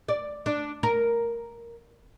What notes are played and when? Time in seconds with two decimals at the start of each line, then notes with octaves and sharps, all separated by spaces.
0.08 D5
0.46 D4
0.83 A#4